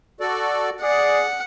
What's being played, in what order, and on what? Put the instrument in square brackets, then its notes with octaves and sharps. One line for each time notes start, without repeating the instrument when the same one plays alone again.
[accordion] F#4 A4 D5
[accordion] G#4 [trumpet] D5 [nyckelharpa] F#5